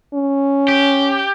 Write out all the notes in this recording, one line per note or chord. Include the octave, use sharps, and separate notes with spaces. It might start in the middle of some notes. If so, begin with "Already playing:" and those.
C#4
G4